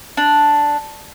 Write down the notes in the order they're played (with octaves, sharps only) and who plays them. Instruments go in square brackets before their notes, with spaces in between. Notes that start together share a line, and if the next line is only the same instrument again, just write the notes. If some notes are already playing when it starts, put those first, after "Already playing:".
[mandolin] D4